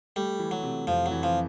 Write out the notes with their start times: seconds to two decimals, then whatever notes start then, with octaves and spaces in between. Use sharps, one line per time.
0.16 G3 A3
0.39 E3
0.51 F#3
0.63 C3
0.87 F2 F3
1.06 F#3
1.11 E3
1.23 F3